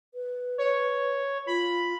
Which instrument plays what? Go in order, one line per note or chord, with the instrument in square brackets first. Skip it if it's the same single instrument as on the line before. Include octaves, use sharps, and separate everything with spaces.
[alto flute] B4
[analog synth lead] C#5
[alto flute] F4 [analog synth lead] B5